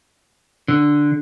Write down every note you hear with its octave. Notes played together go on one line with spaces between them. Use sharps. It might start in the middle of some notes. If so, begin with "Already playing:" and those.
D3